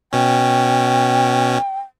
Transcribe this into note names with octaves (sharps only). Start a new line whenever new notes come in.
B2 C#4 G5